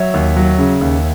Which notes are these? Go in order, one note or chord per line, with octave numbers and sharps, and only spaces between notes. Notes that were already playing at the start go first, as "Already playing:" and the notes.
Already playing: F#3 C#5 E5
D#2
F#3
C#3
D#2